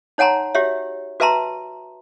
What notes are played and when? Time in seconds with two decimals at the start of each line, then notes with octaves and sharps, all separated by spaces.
0.18 D#4 C#5 F#5 G#5 A#5 C6
0.55 F#4 G4 C#5 E5
1.20 F#4 B4 E5 A5 A#5 C6